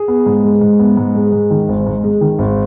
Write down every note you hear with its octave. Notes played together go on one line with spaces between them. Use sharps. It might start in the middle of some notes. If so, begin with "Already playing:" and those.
Already playing: G#4
B3
G#2
G#3
G#2
B3
G#2
G#3
G#2
D#3
G#1
G#2
G#3
D#3
G#1